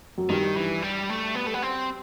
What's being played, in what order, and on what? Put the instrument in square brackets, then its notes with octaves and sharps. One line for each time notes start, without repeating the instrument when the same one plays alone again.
[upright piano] F#2
[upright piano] G2 [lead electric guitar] D#3
[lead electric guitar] E3
G3
A3
B3
A3
B3
C4